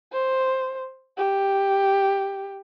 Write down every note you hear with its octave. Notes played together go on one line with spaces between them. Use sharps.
C5
G4